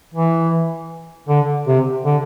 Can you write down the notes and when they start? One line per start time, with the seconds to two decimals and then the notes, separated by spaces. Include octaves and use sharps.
0.14 E3
1.29 D3
1.67 C3
2.05 D3